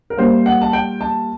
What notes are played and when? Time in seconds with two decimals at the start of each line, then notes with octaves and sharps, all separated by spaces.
0.10 A#4
0.17 A#2 G3 A#3 C5
0.46 F#5
0.62 A5
0.73 G5
1.01 A5